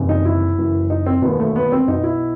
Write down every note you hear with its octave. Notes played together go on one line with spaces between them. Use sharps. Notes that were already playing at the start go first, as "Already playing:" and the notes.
Already playing: F#1 E2 C3 D#3
D#4
E4
F#1 F#2 E3
D#4
C4
E1 D#2 D#3 B3
A3
B3
C4
B1 B2 D#4
E4